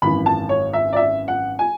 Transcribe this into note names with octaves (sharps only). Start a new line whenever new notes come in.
G#1 F#2 E3 B5
A5
C#5
E5
D5
E5
F#5
G#5